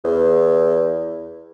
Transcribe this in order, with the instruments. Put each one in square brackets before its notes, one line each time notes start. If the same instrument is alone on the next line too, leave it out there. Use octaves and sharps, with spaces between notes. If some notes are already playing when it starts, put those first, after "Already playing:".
[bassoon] E2